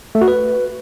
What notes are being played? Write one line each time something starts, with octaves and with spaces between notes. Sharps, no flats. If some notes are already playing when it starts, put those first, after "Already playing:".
A3
F#4
B4